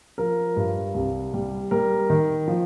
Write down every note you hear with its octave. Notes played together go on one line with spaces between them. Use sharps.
F3 A#4
G2
C2
G3
G3 A#4
D#3
F3